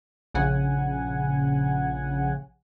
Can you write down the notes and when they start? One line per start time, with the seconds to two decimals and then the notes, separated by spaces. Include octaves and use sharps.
0.34 A#1 C#3 F#5 G#5